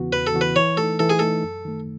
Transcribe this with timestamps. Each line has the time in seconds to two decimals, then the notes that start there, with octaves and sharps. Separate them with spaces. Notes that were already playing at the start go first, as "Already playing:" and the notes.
Already playing: E2 C#3 E3 B3 F#4
0.12 E2 B4
0.27 A4
0.34 C#3 E3 B3 F#4
0.41 B4
0.56 E3 C#5
0.77 A3 D#4 A4
0.99 E3 A4
1.10 G#4
1.19 A3 D#4 A4
1.43 F#2
1.65 D#3 A3